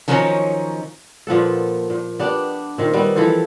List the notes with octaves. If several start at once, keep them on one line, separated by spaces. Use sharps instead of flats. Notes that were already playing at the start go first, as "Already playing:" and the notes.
D#3 F3 F#3 C#4 D#4 C#5
A#2 F3 B3 A4
A#2
B3 D4 G4
A#2 D#3 C4
G3 B3 C4
E3 F3 A4 C5